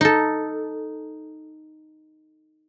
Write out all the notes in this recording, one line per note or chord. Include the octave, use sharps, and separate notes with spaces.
D#4 A4